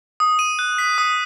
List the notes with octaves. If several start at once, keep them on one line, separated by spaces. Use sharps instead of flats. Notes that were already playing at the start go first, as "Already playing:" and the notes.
D#6
D#7
F#6
B6
D#6